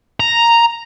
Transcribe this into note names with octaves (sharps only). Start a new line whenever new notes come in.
A#5